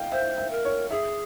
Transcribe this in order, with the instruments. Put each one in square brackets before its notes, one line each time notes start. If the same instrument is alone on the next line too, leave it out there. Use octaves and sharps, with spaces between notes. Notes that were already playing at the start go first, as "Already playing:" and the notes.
Already playing: [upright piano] F5 G5
[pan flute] C5 [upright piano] E5
[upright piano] E5
[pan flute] A#4
[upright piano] C#5
[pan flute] G#4 [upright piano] E5